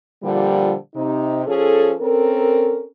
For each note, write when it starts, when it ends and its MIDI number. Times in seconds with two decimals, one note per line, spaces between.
0.23 0.73 46
0.23 0.73 50
0.23 0.73 53
0.23 0.73 55
0.94 1.43 48
0.94 1.43 63
1.46 1.92 53
1.46 1.92 61
1.46 1.92 68
1.46 1.92 69
2.00 2.84 60
2.00 2.84 61
2.00 2.84 69
2.00 2.84 70